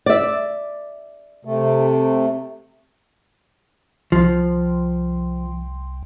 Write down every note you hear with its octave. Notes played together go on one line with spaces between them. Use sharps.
D5 E5
C3 A3
C2 F3